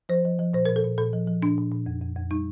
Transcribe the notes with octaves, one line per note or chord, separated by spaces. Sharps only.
F3 C5
F3
F3
A#2 C5
A#4
A#2
A4
A#2
A#2 A4
F3
F3
A#2 D4
A#2
A#2
F2
F2
F2
G3 D#4